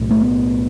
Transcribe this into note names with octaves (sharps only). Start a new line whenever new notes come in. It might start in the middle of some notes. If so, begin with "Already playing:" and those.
Already playing: B1 A2
A3
B3